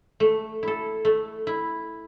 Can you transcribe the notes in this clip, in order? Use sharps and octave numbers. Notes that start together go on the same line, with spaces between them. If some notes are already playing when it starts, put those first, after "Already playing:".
A3
E4 A4
A3
E4